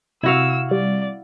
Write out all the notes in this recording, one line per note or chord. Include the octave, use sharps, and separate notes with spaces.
C3 E4 F#4 F5 E6
G3 D5